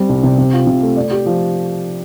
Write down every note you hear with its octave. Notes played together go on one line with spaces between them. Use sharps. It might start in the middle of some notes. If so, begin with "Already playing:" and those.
Already playing: G3 C4
C2
C3
C3
F4
C3
A3
D5
G4
F3